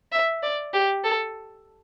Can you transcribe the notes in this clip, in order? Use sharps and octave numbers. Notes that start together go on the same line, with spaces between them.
E5
D5
G4
A4